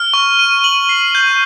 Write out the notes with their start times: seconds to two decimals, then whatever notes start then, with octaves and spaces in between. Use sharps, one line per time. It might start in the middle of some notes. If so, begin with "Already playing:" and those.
Already playing: F6
0.14 C#6
0.39 D#7
0.64 F#7
0.89 C7
1.15 G6